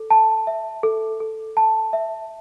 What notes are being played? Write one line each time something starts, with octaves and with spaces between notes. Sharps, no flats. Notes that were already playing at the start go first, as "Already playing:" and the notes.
Already playing: A4
A5
E5
A4
A4
A5
E5